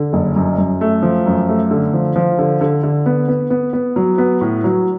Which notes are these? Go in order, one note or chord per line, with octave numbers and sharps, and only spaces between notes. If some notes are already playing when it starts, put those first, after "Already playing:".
Already playing: D3
F#1
F#2
F#2
A3
F3
F#2
A3
D3
F3
F3
D3
D3
D3
B3
B3
B3
B3
F#3
B3
A2
F#3